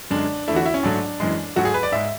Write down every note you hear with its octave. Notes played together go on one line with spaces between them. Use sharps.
F#2 D3 G#3 D4
E2 D3 A3 E4
F#4
E4
C#4
G#2 F#3 A3 D4
F#2 E3 G#3
G#2 F#3 A3 F#4
G#4
B4
D5
G#2 G#3 E5